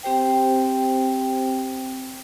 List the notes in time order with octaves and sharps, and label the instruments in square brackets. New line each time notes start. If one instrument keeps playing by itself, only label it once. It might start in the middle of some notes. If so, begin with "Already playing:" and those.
[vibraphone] C4 G4 C5 G5